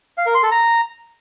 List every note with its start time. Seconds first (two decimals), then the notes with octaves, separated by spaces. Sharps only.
0.18 F5
0.26 A#4
0.35 C6
0.43 A4
0.51 A#5